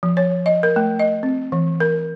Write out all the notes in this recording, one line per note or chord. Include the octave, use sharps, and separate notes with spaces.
F3
C#5
D#5
A#4
A3
D#5
C4
E3
A#4